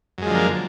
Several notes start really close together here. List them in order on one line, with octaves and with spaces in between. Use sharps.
F#2 G#3 F3 D3 A#3